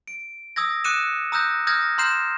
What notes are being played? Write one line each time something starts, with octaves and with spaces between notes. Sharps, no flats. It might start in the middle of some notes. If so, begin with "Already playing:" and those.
D7
D#6 E6 G#6 A#6
D6 D#6 F#6 C#7 D#7 E7
A#5 D#6 E6 F#6 G6 A#6
D#6 F6 G6 G#6 A#6
A#5 C6 F6 G6 C7 E7